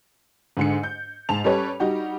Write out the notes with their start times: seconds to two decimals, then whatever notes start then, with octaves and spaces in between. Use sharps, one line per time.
0.57 G#2 D3 C#7
0.83 G6
1.29 G#2 A5 F7
1.44 G3 C#4 G4 A4 B4 C#5
1.80 G3 D#4 F#4 G4